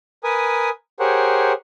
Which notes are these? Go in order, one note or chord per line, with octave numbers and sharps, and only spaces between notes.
A#4 B4 G#5 D#6
G4 G#4 A#4 C5 C#5 F#5